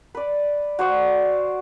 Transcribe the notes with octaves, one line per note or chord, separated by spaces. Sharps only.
B4 D5
F#4 C5 D5 F5